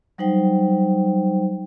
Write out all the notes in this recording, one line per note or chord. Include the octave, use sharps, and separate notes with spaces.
F#3 G3 D#4 C5 G5